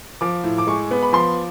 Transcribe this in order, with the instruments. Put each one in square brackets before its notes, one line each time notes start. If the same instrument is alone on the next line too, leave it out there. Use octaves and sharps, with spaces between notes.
[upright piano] F3 D6
A2
D6
G#3 C#6
B3
B5
F3 C6